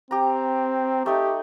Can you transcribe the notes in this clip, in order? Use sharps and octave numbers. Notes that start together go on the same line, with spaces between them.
C4 G4 A#5
A3 D#4 G4